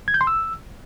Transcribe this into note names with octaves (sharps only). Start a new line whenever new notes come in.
G#6
G6
C6
E6